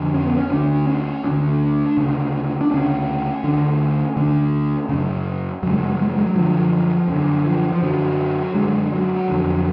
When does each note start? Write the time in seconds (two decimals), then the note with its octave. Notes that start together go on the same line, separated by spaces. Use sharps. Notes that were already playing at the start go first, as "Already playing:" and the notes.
Already playing: F2 D3
0.14 C#4
0.26 B3
0.37 C#4
0.51 D2 D3 D4
0.87 C#4
1.24 D2 D3 D4
1.97 D2 C#3
2.61 D4
2.71 D2 C#3 C#4
3.44 D2 D3
4.17 D2 D3
4.89 F#2 C#3
5.63 F#2 F#3
5.66 C#3 G#3
5.78 F#3
5.86 G#3
5.94 F#3
6.02 G#3
6.09 F#3
6.18 G#3
6.26 F#3
6.35 F#2 D3 F3
7.08 F#2 D3
7.45 F3
7.73 F3
7.82 F#2 D3 F#3
8.55 F#2 D3 G#3
8.92 F#3
9.28 F2 D3